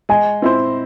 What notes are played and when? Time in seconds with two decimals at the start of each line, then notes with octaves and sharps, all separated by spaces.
0.09 G#3 G#5
0.42 C4 E4 C5